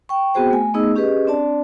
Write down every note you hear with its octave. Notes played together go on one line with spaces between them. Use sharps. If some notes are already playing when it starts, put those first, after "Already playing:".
G5 C#6
B3 C4 F#4 G#4 C5 G5
A3 G#5
A3 B3 D#4 G#4 D#5 E6
C#4 G4 G#4 B4 D#5
C4 D4 D5 A5